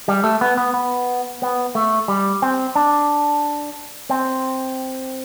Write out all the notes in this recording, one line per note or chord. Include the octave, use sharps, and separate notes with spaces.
G3
A3
B3
B3
B3
B3
A3
G3
C4
D4
C4